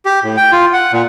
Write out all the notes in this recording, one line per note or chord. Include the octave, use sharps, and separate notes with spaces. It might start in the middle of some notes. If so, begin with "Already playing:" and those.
G4
A2
G5
F4
F#5
A#2